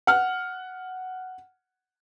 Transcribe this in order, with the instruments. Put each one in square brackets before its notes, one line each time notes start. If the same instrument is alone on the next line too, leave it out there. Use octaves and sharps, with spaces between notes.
[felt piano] F#5 F6